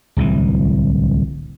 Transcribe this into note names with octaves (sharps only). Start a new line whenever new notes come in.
D1 C2 E3